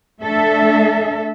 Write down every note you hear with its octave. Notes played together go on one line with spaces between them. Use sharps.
A3 D4 A4 E5